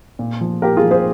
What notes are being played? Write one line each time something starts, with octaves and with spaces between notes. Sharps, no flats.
A#2
F3
A#2 G4 A#4
F4 G#4
F3
G#4 C5